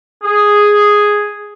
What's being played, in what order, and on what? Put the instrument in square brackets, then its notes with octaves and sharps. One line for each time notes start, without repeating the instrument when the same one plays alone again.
[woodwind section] G#4